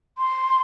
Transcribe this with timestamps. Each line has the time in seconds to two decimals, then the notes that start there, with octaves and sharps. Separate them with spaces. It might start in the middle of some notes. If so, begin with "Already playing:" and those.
0.18 C6